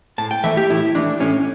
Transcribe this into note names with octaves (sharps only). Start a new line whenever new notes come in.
A2 A5
G5
E3 A3 E5
G4
A2 E4
E3 A3 D4
A2 C#4